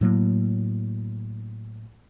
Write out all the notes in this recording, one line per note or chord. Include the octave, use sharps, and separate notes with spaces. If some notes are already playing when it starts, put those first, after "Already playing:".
A2 F#3 A#3